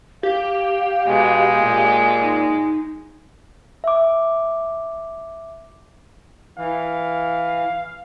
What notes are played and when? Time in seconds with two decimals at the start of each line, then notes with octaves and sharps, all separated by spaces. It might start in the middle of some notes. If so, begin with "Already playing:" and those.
0.23 G4 F5
1.07 B2 G#3
1.61 A#2
2.22 D#4
3.84 E5 D6
6.58 E3 F5